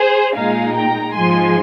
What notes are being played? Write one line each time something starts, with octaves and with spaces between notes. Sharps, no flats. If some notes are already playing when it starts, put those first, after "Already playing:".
Already playing: G#4 C5
A#2 G#3 D#4 F5 G#5
G5 A#5
G#2 F3 G#3 G#5 C6